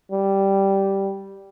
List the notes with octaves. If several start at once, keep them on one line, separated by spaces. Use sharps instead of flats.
G3